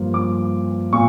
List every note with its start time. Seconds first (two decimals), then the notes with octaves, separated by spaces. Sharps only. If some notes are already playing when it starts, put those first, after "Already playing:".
Already playing: G2 F3 A#3
0.14 D6
0.93 A#2 C#6